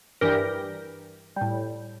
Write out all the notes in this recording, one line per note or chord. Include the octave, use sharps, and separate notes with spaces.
G2 E3 G3 G4 A#4
A2 G3